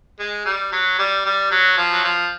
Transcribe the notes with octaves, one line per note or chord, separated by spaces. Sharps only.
G#3
G3
F#3
G3
G3
F#3
F3
F#3
F3